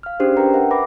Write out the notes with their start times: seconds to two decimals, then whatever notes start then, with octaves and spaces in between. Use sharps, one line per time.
0.03 F5 F6
0.20 C#4 D4 G4 G#4 C5
0.37 A#4 B4 G5 A#5
0.54 E5 F#5
0.71 B4 B5 D6 A#6